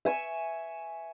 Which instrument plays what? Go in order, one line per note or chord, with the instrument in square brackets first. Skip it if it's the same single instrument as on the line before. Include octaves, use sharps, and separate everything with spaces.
[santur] E5 G#5 C#6